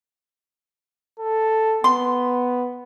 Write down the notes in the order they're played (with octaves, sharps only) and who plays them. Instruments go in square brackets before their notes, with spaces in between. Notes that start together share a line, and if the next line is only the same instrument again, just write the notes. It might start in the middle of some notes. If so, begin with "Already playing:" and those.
[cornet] A4
[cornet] B3 [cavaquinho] C6